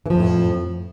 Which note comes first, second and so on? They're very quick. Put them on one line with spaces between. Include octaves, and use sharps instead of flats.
E3 F3 F2 A2